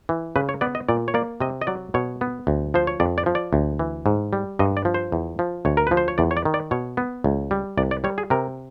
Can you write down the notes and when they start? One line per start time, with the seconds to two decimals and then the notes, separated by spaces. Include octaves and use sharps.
0.09 E3
0.36 C#3 B4
0.49 C#5
0.61 B3 D5
0.75 D#5
0.89 A#2 D5
1.08 C#5
1.14 A#3 D5
1.40 C3 D#5
1.61 D#5
1.67 F#3 D5
1.94 B2 C#5
2.21 B3
2.47 D2
2.74 F3 C5
2.87 C#5
3.00 F2 D5
3.18 D5
3.26 F3
3.35 D5
3.53 D2
3.79 E3
4.06 G#2
4.33 G3
4.59 G2 D#5
4.77 D5
4.85 F3
4.94 C5
5.12 E2
5.39 F3
5.65 D2 C#5
5.77 A#4
5.87 F3 B4
5.97 C5
6.08 C#5
6.18 E2 D5
6.31 C#5
6.37 D5
6.45 D#3
6.54 D5
6.71 B2 C#5
6.97 B3
7.24 C#2
7.51 G3
7.77 C2 D5
7.91 D5
8.04 G3 C#5
8.18 G#4
8.30 C3 A#4